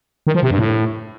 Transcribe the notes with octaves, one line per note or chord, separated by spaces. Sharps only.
D#3
F3
C3
G2
A2